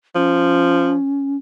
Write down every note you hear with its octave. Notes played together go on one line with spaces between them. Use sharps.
F3 C#4